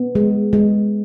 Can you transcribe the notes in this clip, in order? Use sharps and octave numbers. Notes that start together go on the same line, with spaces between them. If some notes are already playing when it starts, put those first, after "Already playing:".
Already playing: B3
G#3
G#3